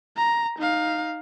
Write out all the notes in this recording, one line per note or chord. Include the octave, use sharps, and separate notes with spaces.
A#5
D#4 F5